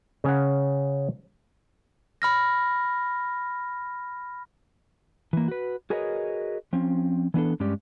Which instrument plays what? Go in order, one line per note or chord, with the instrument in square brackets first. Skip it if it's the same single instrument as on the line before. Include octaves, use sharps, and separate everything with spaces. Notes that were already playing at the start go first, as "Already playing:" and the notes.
[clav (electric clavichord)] C#3 C#4 F#5
[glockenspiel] B5 F6 A#6
[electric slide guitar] E3 A#3
F#4 B4
F#4 G#4 A#4 B4 C#5 D#5
F3 C4 C#4
E3 B3 D4 A4
G2 G#3 C#4 G4 D5